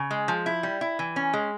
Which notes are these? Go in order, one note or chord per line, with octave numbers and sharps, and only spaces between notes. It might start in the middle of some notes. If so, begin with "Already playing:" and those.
Already playing: C#3
G#3
F3
E4
G3
E4
E3
C#4
G#3